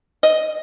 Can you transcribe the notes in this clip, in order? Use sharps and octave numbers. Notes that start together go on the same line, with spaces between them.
D#5